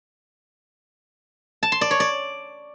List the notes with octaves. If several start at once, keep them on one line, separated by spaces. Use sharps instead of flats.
A5
C6
D5
C#5
D5